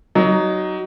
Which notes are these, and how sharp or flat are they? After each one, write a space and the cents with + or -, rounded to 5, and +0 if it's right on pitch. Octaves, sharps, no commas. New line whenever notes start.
F#3 +20 D#4 +0